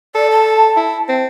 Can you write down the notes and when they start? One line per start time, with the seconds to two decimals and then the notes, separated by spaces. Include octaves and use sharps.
0.15 A4 D5
0.31 A5
0.77 E4
1.09 C4